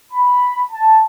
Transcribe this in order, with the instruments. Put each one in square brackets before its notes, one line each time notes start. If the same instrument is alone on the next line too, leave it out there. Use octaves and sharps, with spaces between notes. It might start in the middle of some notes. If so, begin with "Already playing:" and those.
[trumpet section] B5
A5